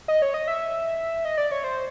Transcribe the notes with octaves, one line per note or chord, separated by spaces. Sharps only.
D#5
C#5
D#5
E5
D#5
D5
C#5
C5